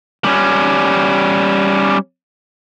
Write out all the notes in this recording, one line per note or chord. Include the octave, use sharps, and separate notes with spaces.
G3 C#4